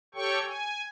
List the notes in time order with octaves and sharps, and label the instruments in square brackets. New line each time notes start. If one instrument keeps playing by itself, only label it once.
[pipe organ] G4 A4 C#5 G5 C#6
G#5